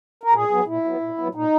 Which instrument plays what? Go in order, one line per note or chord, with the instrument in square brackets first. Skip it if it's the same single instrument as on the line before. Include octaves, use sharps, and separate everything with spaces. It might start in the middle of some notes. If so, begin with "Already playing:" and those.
[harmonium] A#4
A#2 G#4
F#3 B3
A#2 E4
F#3 B3
A#2
F#3 B3
A#2 D#4